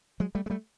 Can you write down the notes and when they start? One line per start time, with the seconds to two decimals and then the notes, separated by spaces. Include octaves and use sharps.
0.20 F#3 G#3
0.35 G3 A3
0.46 G#3
0.50 G3 A3